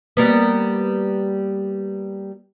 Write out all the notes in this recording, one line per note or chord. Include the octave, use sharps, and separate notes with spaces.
G3 A#3 B3